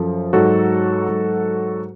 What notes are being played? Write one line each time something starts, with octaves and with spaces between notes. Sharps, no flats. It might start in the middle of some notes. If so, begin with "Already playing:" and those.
Already playing: F#2 F3 A4
G#2 F#3 F#4 A4
G#2 F#3